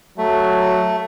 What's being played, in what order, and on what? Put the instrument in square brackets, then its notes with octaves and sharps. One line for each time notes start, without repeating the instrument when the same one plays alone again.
[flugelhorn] F#3 [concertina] A3